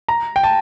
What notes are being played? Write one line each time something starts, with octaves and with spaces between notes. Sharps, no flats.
A#5
G5
A5